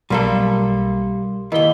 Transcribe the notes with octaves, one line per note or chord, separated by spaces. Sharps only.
B1 G3 A#3 A4 C6
D#2 E3 A#3 D#4 D#5 B6 G7